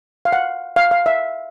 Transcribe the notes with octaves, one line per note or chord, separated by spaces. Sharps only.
F5
F#5
F5
F5
E5